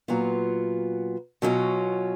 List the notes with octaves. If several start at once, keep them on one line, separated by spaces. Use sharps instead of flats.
A#2 F#3 B3 F4
B2 F#3 C#4 F4